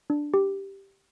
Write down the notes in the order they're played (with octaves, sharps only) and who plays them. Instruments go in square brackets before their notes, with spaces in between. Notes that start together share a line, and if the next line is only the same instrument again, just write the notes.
[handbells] D4
G4